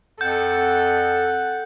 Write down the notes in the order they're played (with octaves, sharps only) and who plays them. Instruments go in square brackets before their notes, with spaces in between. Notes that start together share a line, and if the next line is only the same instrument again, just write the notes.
[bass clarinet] F2 [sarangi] A4 [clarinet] F#5 [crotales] G6